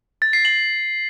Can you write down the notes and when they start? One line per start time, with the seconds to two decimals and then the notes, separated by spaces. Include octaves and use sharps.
0.22 A6
0.33 C7
0.45 F#7